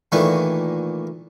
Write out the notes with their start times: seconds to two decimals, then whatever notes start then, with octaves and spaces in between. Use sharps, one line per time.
0.12 A#2 D#3 E3 A3 C#6